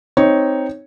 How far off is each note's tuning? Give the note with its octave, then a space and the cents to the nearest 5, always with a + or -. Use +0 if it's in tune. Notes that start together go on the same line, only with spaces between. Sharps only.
C4 +0 D#4 +0 C#5 +0